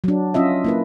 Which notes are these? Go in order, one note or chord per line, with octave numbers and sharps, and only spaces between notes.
F#3 D4
C#4 F4 D#5 E5
A#3 E4 B4